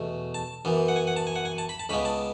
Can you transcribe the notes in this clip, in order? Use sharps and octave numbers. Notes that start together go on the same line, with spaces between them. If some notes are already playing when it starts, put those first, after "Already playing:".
Already playing: E2 B2 A3
A5
F#2 E3 B3
F#5
G#5
F#5
A5
G#5
F#5
G#5
A5
B5
A5
C#2 C#3 G#3 B3 B5
A5